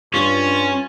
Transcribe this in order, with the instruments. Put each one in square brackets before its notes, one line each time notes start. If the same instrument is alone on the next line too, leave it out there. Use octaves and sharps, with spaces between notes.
[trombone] G2 [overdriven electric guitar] C#4 [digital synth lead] F4